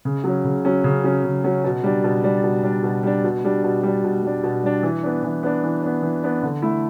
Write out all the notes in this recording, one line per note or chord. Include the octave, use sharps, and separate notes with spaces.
C#3
F#3 C#4
C#3
F#3 C#4
C#3
F#3 C#4
C#3
F#3 C#4
B2
G3 D4
B2
G3 D4
B2
G3 D4
B2
G3 D4
B2
G3 D4
B2
G3 D4
B2
G3 D4
B2
G3 D4
E3
B3 D4
E3
B3 D4
E3
B3 D4
E3
B3 D4
D3
A3 E4